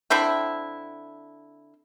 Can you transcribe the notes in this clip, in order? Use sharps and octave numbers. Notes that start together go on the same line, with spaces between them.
D3 C4 E4 G5